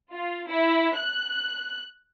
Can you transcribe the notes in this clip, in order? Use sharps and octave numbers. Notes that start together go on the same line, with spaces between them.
F4
E4
F#6